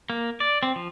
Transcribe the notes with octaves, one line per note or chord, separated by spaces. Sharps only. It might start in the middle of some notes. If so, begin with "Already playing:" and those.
A#3
D5
C4
F3